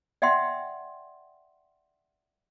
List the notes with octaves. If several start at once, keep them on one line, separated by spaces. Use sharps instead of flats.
D5 E5 F#5 G5 C6